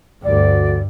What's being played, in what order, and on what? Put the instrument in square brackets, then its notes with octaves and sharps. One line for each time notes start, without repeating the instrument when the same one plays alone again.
[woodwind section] D2 D3 D5 [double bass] G2